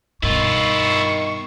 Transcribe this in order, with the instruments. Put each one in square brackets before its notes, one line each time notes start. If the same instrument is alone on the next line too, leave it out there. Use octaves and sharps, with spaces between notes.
[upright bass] G2 B2 [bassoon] D#3 [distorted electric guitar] E4 F4 [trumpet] C#6